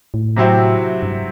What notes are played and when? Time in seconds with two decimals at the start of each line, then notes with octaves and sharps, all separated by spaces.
0.14 A2
0.36 C3 F#3 C4 E4
1.03 G2